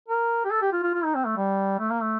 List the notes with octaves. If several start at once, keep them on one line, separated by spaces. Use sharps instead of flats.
A#4
G4
A4
G4
F4
F4
F4
D#4
C4
A3
G3
A3
A#3
A3